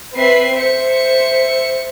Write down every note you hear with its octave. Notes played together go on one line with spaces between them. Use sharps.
C4 B4 E5 C7
C5 E5 C#7